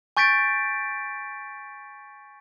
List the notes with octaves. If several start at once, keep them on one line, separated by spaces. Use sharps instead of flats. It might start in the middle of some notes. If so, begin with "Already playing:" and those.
G#5 C#6 G6 A6 B6 D7